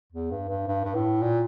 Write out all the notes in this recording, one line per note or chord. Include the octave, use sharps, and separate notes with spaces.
E2
G2
G2
G2
G2
A2
A#2